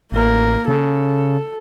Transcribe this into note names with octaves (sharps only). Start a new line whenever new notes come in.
A1 A#3 A#4
C#3 A4